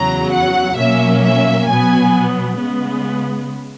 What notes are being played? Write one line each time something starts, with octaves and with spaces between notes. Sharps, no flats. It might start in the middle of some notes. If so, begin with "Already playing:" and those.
Already playing: E2 C#3 F#3 A#5
F#5
B2 F#3 A#3 C#4 E5
E5
B2 F#3 B3 G#5
C#3 G#3 B3